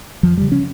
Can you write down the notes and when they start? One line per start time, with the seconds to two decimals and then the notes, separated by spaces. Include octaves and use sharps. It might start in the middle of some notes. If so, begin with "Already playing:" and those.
0.23 F2 F3
0.37 C#3 G3
0.52 C#4